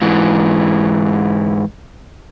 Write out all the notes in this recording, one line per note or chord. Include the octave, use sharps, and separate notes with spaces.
G#2 E3